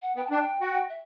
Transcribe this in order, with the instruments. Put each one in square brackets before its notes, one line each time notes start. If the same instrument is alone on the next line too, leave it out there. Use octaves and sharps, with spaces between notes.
[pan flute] F#5
[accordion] B3 [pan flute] G5
[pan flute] A5
[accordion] D4 [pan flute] G5
[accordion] F#4
[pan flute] E5